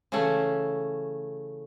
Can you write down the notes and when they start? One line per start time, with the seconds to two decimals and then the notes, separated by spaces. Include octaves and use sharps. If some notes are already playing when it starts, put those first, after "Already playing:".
0.12 C#3 E3 A3 C#4 F#5